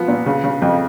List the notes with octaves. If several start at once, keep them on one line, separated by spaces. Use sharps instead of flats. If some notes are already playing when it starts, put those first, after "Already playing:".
Already playing: F3 B3
A#2
C#3
C#3
F2